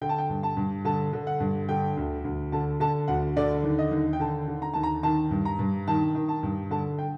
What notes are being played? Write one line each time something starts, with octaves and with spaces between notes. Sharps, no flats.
D3 G5
A5
G5
G2
A5
G2
D3 A5
D3
F#5
G2
D3 G5
D2
D2
D3 A5
D3 A5
D2 F#5
D3 D5
D#2
D#5
D#2
G5
D3 A5
D3
A#5
D#2 A5
A#5
D#3 A5
G2
A#5
G2
D#3 A5
D#3
A5
G2
D3 A5
G5